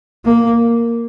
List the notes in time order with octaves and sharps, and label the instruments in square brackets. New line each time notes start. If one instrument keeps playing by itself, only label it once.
[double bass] A#3